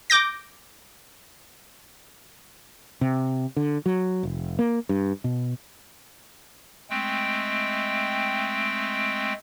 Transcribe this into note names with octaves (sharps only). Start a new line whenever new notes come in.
D6 G6 A#6
C3
D3
F#3
F1
A#3
G2
B2
G#3 A3 C4 G5